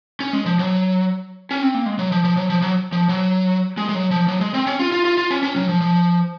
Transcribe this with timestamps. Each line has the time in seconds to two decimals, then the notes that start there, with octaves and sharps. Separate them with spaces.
0.20 C#4
0.33 G#3
0.46 F3
0.59 F#3
1.51 C#4
1.62 C4
1.74 A#3
1.86 G#3
1.99 F#3
2.12 F3
2.24 F3
2.37 F#3
2.50 F3
2.62 F#3
2.92 F3
3.09 F#3
3.77 G#3
3.89 G#3
3.95 F#3
4.11 F3
4.28 F#3
4.41 G#3
4.54 C4
4.67 C#4
4.80 F4
4.92 F4
5.05 F4
5.18 F4
5.31 C#4
5.43 C#4
5.56 F#3
5.69 F3
5.82 F3